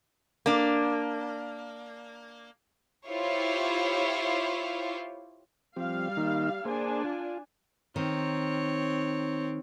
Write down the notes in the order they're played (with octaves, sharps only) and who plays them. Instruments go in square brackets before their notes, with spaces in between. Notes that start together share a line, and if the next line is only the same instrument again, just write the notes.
[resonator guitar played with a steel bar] A#3 D4
[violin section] E4 F4 G4 C5 C#5
[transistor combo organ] F3 C4 G4 [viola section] G3 F5
[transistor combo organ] D#3 A#3 D#4
[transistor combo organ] A#3 G#4 C5 [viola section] D4 G#5
[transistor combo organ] F4
[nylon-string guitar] D#3 [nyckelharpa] C4 C#5